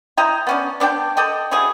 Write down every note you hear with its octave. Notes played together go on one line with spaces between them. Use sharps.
E4 D#5 G5 A#5
B3 C#4 D4
B3 D4 A#4 G5
A4 D5 D#5 G5
E3 F#3 A3 G#4